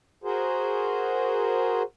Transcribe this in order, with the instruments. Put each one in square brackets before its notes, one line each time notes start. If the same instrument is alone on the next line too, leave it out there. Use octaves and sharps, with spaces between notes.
[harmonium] F#4 G#4 A#4 C5